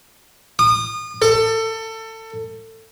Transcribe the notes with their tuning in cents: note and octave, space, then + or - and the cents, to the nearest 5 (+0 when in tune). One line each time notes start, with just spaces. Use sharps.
D#6 -30
A4 +25